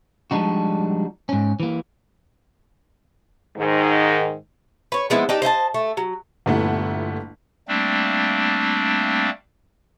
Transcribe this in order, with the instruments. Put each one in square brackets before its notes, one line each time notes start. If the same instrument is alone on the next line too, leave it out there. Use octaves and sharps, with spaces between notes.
[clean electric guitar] F3 G3 G#3 D4 D#4 F#4
G#2 C#4
E3 A#3
[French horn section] G#2 D#3
[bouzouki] B4 C#5
F3 G#3 B3 E4
D4 D#4 G4
C5 D#5 E5 A5
A3
F#3
[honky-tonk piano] G1 A#2 A3 B3 E4 F#5
[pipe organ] G3 A3 A#3 C4 D4